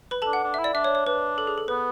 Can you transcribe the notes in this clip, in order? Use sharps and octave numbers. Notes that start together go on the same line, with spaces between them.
B4 B5
A4 A5
D4
F#5
D4
E5
E4
D5
D4 E5
C#5
C#5
D4 B4
A4
G#4
A4
B3 B4